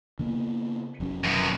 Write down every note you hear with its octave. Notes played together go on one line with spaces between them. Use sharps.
C#3 A#3 B3
F1 F#3 C#4
F#2 B2